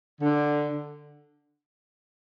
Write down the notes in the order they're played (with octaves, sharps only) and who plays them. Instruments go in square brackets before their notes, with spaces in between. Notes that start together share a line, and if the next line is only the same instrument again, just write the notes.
[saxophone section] D3